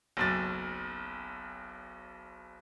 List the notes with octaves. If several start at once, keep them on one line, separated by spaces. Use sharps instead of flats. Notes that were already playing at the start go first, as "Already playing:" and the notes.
F#1 B1 A6